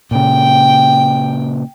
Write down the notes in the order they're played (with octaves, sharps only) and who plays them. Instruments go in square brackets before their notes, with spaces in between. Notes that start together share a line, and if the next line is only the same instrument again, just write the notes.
[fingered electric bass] A#2 C#3 [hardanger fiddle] G5